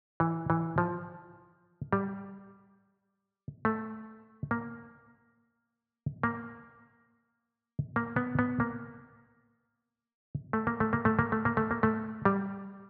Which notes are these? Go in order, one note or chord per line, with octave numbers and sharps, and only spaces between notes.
E3
E3
F3
G3
A3
A#3
A#3
A#3
B3
B3
A#3
A3
A#3
A3
A#3
A3
A#3
A3
A#3
A3
A#3
A3
G3